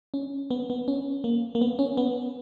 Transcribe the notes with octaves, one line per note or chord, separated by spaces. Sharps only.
C#4
B3
B3
C#4
A#3
A#3
B3
C#4
B3